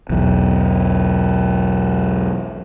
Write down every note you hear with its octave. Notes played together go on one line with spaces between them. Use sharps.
B1 E2